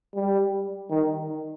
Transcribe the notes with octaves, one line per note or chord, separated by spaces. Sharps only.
G3
D#3